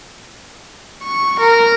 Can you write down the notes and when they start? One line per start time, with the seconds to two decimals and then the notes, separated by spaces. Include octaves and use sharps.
1.04 C#6
1.39 A#4